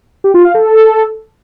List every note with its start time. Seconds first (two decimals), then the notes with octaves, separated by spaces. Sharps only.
0.24 G4
0.34 F4
0.44 F5
0.54 A4